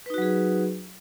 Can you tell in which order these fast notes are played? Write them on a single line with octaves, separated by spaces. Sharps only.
B4 D#4 F#4 F#3 G#4